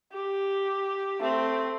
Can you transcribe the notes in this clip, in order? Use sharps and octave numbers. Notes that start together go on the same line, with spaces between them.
G4
A3 C4